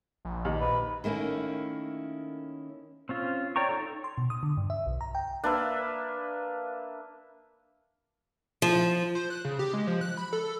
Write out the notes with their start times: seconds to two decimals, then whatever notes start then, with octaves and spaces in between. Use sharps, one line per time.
0.25 A#1
0.45 D#2
0.61 B4
1.04 D#3 A3 A#3 C#4 E4
3.09 C4 C#4 F4
3.56 C#5 D5 G5 A#5 C#6
3.69 D#4 A4
4.04 C6
4.18 B2
4.30 D#6
4.43 D3
4.57 G2
4.70 E5
4.86 B1
5.01 A#5
5.15 G5
5.44 A#3 D4 B4 E5
8.62 F3
9.15 C5
9.30 F#6
9.45 C#3
9.59 G4
9.74 G#3
9.87 F3
10.01 F#6
10.17 B5
10.33 A4